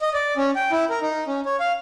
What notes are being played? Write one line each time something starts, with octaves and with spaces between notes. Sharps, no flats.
D#5
D5
C#4
G5
E4
A#4
D#4
C#4
C#5
F5